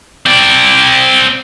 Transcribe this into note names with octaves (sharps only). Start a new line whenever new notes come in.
C4 D5